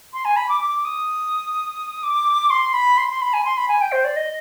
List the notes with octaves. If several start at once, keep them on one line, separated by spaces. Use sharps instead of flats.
C6
G#5
B5
D6
D6
D#6
D6
C6
B5
C6
C6
B5
G#5
C6
B5
G#5
G5
C5
D5
D#5